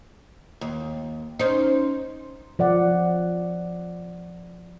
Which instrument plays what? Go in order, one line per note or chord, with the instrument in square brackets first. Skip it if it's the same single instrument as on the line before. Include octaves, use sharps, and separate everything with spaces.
[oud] D#2
[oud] C#4 D#4 [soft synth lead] C5
[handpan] F3 D5 F#5